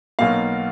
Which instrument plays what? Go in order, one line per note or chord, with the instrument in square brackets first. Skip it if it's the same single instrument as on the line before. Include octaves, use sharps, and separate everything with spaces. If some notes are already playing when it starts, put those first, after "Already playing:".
[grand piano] B1 B2 A#3 F5